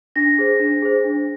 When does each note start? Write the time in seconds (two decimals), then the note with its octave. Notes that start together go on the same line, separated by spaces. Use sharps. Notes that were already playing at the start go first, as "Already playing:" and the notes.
0.16 D4 A#6
0.38 G#4 C5
0.60 D4
0.82 G#4 C5
1.04 D4